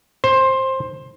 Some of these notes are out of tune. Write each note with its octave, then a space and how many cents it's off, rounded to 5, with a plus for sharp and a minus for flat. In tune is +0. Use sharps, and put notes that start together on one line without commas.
C5 +15